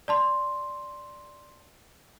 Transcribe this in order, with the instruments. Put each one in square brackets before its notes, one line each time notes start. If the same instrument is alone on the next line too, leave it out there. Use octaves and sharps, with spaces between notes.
[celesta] D5 A5 C6